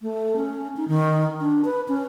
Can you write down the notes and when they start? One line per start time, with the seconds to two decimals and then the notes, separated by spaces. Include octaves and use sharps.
0.01 A3
0.36 C#4
0.77 D#4
0.88 D#3
1.40 D4
1.65 B4
1.88 C#4